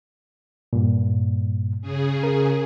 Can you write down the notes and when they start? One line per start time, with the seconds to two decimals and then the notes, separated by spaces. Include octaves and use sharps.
0.73 G2 A#2
1.81 C#3 G#4
2.24 A#4